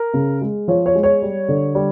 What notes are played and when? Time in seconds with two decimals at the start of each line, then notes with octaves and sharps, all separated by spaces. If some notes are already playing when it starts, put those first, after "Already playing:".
Already playing: A#4
0.14 C#3
0.42 G#3
0.68 F3 C#5
0.86 C#5
0.95 G#3
1.03 C#5
1.22 G3
1.48 D3
1.75 G3